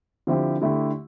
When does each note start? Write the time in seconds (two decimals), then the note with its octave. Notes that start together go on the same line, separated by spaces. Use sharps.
0.27 D3 F3 C4 E4 G4
0.62 D3 A3 E4 G4